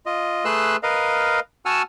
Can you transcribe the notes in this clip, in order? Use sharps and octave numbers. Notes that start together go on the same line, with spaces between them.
F4 D#5
A3 G#4 B4 C6 E6 F#6
A#4 B4 D#5 F5
F#4 F#5 G#5 A5 E6 F6